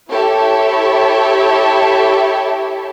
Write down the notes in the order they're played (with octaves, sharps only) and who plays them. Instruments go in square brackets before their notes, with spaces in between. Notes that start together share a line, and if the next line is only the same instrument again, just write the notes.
[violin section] E4 G4 A4 C#5 E5